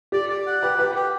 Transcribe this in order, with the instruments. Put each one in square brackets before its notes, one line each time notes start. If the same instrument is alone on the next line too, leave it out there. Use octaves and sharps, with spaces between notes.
[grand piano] G4 [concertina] D5
[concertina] D5
F#5
[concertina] G4 [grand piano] B4
[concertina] G4 [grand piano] B4
[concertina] G4